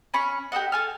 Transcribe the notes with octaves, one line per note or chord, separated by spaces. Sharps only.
C#4 B5 C#6
G4 A4 D#5 F#5
A4 G#5 F6